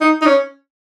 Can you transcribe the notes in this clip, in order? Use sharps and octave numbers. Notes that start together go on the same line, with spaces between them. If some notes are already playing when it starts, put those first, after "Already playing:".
D#4
D#4
C#4